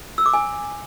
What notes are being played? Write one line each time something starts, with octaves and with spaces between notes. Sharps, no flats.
E6
D6
G#5